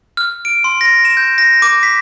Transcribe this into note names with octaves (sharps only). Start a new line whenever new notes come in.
F6
D7
C6
A#6
E7
G6
A#6
D6
B6